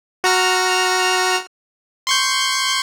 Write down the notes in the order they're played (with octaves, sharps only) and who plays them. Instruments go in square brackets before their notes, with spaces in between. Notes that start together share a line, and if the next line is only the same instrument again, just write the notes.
[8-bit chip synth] F#4 A#5 F6
C6 C#6 G6